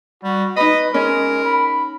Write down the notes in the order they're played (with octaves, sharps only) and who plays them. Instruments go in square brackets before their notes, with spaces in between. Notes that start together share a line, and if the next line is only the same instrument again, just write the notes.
[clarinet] G3 [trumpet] F#4
[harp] D#4 B5 [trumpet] B4 [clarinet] D#5
[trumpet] G#3 [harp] C#4 [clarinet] A#4
[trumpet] B5